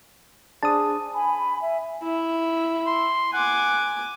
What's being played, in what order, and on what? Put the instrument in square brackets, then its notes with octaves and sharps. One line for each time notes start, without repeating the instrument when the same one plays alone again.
[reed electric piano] D4 C5 [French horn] G#4 [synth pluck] A5 D#6
[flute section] G#5 B5
E5 G#5
[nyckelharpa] E4
[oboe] C6
[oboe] F#5 [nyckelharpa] G#5 D6